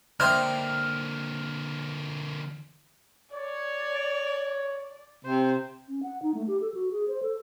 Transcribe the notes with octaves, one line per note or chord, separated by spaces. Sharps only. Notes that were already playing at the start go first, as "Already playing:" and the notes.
D3 A#3 D4 C5 D#5 E5 G5 F6
C#5 D5
C3 C5
C#4
F#5
D#4
A3
G4
A4
F#4
G#4
C5
A4